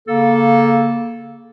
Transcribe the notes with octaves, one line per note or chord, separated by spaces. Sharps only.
C#3 A#3 A4